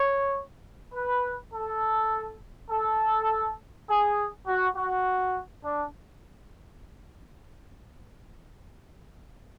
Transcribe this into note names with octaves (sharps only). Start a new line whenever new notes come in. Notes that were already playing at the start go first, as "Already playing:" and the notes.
Already playing: C#5
B4
A4
A4
G#4
F#4
F#4
D4